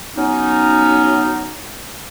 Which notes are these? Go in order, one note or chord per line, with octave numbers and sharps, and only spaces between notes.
F#3 B3 C#4 D#4